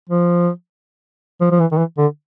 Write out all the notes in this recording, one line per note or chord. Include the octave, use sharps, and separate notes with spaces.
F3
F3
F3
E3
D#3
E3
D3